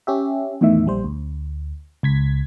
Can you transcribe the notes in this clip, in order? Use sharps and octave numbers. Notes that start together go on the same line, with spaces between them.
C#4 G4 E5
E2 A2 D#3 E5
A#1 G3 C5
D2
C#2 G#6 B6